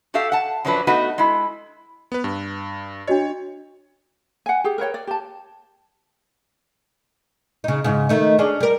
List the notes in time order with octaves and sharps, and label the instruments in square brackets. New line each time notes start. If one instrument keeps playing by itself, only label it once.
[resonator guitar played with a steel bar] F#4 G4 A4 E5 F5
F#5 A5
F#2 F3 F#3 D4 B4
A3 B3 D#4 F#4 B4 D#5
G#3 E4
[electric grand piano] B3 B4
G2
[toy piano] D4 F#4 D#5 [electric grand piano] C#5
[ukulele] F#5 G#5
G4 G#4
A#4 B4 C#5 G5
D5
G4 A5
[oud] C#3 D#4
G#2 C#3
D#3 A3 D#4
C#4 D4 G#4
G3 A#4